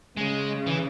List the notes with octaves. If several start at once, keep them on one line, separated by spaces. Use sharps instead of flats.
C#3 G#3
E3